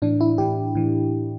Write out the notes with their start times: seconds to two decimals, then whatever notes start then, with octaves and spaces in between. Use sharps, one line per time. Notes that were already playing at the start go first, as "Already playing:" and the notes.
0.02 A2 E3 D4
0.21 E4
0.38 A2 E3 G4
0.75 A2 E3